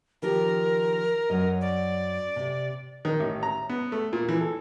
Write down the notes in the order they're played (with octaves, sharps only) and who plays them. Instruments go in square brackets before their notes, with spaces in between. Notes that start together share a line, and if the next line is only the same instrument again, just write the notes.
[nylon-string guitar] D#3 F3 G4 [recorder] A#4
[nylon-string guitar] F#2 F#3 D#5
[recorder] D5
[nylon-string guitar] C3
[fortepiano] D#3
A1
A#5
B3
A3
A#2
E3
A4